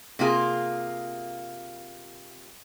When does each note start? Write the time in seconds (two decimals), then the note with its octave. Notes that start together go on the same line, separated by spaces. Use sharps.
0.19 C3 A#3 F4 G#4